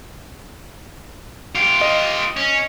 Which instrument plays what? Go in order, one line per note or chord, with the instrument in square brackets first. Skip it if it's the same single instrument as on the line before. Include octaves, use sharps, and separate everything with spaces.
[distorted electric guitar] F4 G4
[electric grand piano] D#5
[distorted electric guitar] C#4